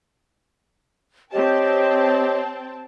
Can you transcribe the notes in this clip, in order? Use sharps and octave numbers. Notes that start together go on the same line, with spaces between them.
C4 G4 C#5 D#5 G5 A5